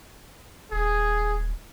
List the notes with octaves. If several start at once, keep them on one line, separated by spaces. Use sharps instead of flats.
D#1 G#4